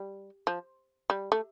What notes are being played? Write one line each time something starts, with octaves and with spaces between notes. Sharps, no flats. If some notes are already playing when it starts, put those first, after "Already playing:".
Already playing: G3
F3
G3
A3